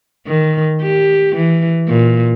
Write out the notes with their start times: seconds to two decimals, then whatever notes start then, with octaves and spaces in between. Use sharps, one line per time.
0.27 D#3
0.82 G4
1.36 E3
1.88 A#2